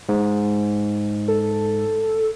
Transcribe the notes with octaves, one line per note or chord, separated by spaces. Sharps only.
G#2
A4